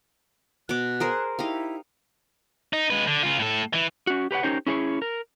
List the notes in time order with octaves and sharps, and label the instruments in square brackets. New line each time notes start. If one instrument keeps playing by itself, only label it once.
[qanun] B2 D6 [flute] F#6
[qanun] G#4 A#4 C5
[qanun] D#4 G4 F5 [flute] E4
[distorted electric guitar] D#4
G#3 B4
D3
C#3 F4
A2 A4
E3 E4
[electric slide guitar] C#4 F#4
G4 B4 C#5 F#5
C#4 D#4 G4 A#4 C5 C#5
C#4 E4 G#4 B4 C#5
A#4